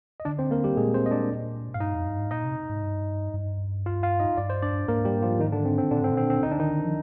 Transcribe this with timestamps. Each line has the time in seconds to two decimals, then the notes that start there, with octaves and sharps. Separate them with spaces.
0.20 D#5
0.25 D3 D4 D5
0.39 C4 C5
0.51 A#3 A#4
0.64 G3 G4
0.76 A#2 G#3 G#4
0.94 C4 C5
1.06 D#5
1.11 D4 D5
1.74 G#2 F5
1.80 G2 D#4 D#5
1.93 F2
2.06 G2
2.18 G#2
2.31 A#2 D#4 D#5
2.44 C3
2.69 G#2
2.83 G2
3.34 G2
3.86 F4 F5
4.03 F4 F5
4.20 D#4 D#5
4.37 G2 D5
4.50 C5
4.62 D4 D5
4.88 G#2 A#3 A#4
5.05 G3 G4
5.22 F3 F4
5.39 D#3 D#4
5.52 D3 D4
5.65 C4
5.78 C4
5.91 A#2 D3 D4
6.01 G#2 C4
6.11 A#2
6.17 C4
6.30 C4
6.43 D3 D#4
6.51 D4
6.59 D#3 D#4
6.84 F3